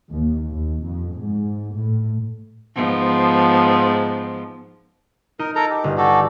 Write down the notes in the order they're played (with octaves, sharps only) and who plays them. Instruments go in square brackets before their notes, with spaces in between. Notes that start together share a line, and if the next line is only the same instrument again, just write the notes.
[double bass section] D#2
D#2
F2
G#2
A2
[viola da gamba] G#2 F3 B3
[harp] D#4 [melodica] A#4
[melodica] A4 A#4 A#5
G4
[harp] G1
[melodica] F#4 G4 A4